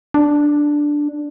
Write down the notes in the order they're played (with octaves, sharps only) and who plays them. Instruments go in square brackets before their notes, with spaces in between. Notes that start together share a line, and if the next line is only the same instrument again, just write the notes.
[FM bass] D4